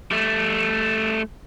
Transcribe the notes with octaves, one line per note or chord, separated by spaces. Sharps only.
G3 A3